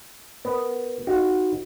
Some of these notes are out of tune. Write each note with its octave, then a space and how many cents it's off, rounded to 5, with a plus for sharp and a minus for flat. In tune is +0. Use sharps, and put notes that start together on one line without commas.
B3 +0 A#4 +0
D#4 +0 F#4 +0 F5 +0